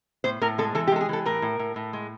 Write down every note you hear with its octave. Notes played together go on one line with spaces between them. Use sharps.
A2 C5
A2 A#4
G#3 A4
E3 A4
G4
G#3 A4
G#4
E3 A4
A2 A#4
A2
A2
A2
G#3